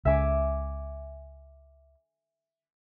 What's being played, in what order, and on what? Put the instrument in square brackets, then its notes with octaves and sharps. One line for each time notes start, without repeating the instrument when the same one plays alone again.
[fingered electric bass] C#2 C#3 [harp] E5 G#5 D6